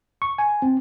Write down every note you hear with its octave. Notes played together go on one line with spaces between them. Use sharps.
C#6
G#5
C4